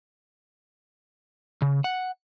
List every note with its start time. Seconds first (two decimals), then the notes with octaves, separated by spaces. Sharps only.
1.62 C#3
1.84 F#5